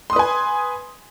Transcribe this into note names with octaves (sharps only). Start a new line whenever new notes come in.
B4 G#5 C6 D#6